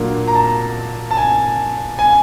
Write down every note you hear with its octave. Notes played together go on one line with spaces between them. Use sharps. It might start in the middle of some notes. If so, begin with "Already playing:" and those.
Already playing: A#2 F#3 A#3 D4
A#5
A5
A5
G#5
G#5